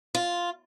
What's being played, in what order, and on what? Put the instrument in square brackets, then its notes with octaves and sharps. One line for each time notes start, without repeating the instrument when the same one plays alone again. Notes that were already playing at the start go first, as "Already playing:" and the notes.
[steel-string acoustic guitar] F4